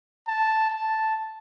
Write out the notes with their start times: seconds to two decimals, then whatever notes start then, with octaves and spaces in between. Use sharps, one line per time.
0.27 A5
0.70 A5